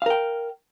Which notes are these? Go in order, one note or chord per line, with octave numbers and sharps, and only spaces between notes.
A#4 F5 G5